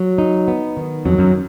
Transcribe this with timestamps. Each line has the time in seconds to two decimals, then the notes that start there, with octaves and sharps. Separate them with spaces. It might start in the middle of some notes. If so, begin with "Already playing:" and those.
Already playing: F#3
0.18 D#4
0.48 B3
0.77 D#3
1.05 F2 F#3
1.18 F#2